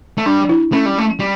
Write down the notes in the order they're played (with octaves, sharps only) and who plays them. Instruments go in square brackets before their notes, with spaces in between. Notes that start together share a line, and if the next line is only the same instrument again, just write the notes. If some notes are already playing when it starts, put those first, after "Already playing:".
[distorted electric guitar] A3
[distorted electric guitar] G3 [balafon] D4
[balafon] E4
[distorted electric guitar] A3 [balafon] C#4
[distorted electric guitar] G3
A3
G3